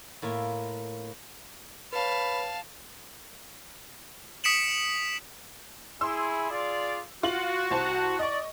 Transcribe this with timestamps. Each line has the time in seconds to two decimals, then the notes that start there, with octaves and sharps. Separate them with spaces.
0.22 A2 A#3 F4 E5
1.93 B4 C#5 F5 A5 B5
4.44 D#6 B6 C#7 D7 E7 F#7
6.01 E4 G#4 C6 E6
6.51 F4 G#4 D5
7.23 F4 F#4 F#7
7.71 C2 C5 A5
8.19 D5 D#5 C#6